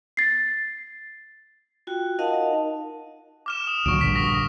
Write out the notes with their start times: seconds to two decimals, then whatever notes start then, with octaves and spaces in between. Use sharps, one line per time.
0.17 A6 C7
1.87 F4 F#4 G5
2.19 D#4 A#4 D#5 F5 F#5 A5
3.46 D6 F6 E7
3.67 D#6
3.86 D2 A#2 F#3 C#6 D7
4.01 A#1 G2 D3 B6
4.15 C#6 D#6 A#6